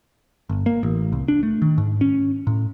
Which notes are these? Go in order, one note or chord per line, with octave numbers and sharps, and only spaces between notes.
G1
A#3
A1
C2
D4
A3
D#3
G#2
C#4
A2